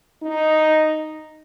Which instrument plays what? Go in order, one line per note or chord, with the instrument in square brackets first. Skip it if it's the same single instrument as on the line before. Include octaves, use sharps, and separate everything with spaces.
[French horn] D#4